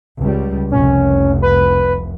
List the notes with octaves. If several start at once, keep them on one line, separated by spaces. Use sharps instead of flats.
C#2 G3
F1 C2 C#4
B4